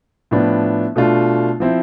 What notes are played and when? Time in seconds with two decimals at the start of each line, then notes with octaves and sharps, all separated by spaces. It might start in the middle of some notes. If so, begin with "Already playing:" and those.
0.31 A2 F3 B3 D4
0.96 B2 A3 D4 F4
1.60 F3 C4 E4